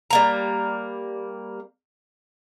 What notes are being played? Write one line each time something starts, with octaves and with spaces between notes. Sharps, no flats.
G3 A#3 A#5